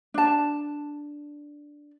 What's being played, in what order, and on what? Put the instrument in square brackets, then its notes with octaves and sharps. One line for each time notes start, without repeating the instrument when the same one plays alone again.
[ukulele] D4 A5